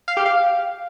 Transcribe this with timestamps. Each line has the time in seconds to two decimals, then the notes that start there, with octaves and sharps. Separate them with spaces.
0.08 F5
0.17 G4
0.26 F5